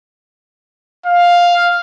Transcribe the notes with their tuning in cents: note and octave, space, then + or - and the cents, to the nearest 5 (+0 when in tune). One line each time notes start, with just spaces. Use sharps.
F5 +5